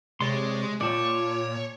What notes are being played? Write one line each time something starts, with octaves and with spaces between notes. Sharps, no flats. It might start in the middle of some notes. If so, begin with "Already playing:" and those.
C3 G#3 C#5 D5 C6
A#2 F4 C#5 D5 G5 A5